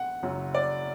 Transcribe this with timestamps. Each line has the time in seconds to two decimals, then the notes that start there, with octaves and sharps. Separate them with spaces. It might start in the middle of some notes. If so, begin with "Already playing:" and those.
Already playing: F#5
0.23 F#1 F#2 F#3
0.55 D5